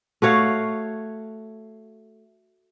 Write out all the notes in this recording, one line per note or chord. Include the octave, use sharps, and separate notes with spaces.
A3 F#4 C#5 F5